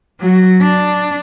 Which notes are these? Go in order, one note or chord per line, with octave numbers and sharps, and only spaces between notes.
F#3 F#4
D4